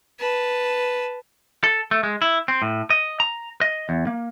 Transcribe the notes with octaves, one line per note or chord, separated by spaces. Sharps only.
B4 A5
A4
A3
G#3
E4
C4
A2
D#5
A#5
D#5
E2
A#3